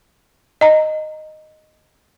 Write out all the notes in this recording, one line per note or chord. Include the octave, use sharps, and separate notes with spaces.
D#5 A#5